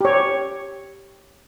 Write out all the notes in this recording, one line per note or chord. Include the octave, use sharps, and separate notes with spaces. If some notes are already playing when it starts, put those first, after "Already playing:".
G4 C#5